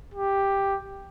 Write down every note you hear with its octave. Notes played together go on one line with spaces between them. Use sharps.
G4